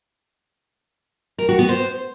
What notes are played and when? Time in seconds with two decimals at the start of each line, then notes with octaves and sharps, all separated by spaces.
1.38 A#4
1.49 F#4
1.59 B3
1.69 C5